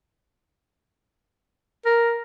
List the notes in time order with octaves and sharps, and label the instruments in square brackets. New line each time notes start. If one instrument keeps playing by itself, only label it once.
[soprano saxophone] A#4